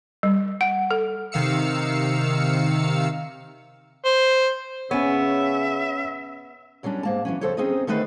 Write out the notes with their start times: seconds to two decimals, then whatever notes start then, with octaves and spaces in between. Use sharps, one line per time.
0.23 G3
0.61 F#5
0.91 A4
1.32 C3 D#3 F5 E6 C#7
4.05 C5
4.91 C#3 B3 C#4 C#5 E5
6.83 F#2 F#3 G3 C#4 D4
7.03 G#2 A#3 A5
7.25 E3 F#3 C#4
7.41 F2 C#3 A4 C5 C#5
7.57 C4 C#4 D#4 G#4 C5 D#5
7.87 D3 D#3 A3 D#4 B4 C5